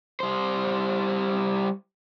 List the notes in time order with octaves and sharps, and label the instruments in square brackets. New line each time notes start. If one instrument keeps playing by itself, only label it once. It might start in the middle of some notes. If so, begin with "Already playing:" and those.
[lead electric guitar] G3 C5